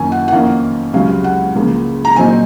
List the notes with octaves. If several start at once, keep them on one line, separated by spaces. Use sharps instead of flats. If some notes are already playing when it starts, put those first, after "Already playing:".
Already playing: F#2 D#3 A#3 C#4 G#5
F#5
F#5
F2 D#3 A#3 C#4 F5
C#2 C3 F#3 C#4 F5
F#5
C#2 C#3 F3 A#3
A#5
A#2 F#3 C4 D#4 G#5